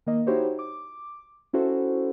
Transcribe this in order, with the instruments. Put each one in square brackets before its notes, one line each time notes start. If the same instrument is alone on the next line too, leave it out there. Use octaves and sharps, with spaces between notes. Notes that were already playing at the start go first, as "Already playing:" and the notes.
[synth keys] D#3 A#3 D#5
D#4 E4 F#4 G4 C5 C#5
D6
C#4 E4 F#4 A4 C5